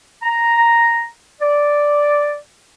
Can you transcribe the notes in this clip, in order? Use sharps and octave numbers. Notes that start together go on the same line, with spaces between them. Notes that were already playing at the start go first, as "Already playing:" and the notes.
A#5
D5